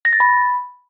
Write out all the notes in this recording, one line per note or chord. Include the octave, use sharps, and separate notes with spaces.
A#6
A6
B5